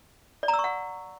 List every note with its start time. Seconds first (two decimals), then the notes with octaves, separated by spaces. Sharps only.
0.43 D5
0.48 A#5
0.54 E6
0.59 C#6
0.64 F#5